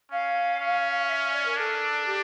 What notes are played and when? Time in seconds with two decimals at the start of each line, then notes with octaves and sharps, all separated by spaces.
0.11 C#4 F5
0.60 C#4
1.08 E5
1.32 D5
1.45 A#4
1.57 D4 A4
2.06 G4